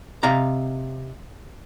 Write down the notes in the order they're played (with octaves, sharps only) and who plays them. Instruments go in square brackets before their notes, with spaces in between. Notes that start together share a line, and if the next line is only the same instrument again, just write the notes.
[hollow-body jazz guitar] C3 D#5 F5 A#5